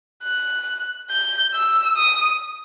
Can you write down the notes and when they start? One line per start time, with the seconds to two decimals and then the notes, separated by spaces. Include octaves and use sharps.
0.24 F#6
1.10 G6
1.54 E6
1.97 D#6